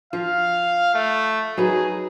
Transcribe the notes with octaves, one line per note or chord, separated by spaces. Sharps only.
F3 F5
A3
F#3 D#4 G#4 B4